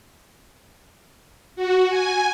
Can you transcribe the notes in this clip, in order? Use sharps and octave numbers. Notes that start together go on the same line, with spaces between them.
F#4
G#5